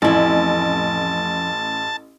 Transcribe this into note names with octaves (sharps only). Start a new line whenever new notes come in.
A1 F2 E4 A5